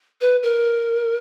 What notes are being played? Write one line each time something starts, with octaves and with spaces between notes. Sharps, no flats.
B4
A#4